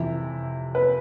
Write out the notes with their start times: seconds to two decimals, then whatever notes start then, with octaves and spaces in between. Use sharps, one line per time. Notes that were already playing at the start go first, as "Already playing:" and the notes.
Already playing: F2 C3 E3 E4
0.75 B4